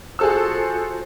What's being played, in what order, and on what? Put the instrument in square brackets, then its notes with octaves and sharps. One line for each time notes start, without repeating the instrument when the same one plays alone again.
[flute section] F4 F#4 C5 [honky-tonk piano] G#4 A4 E6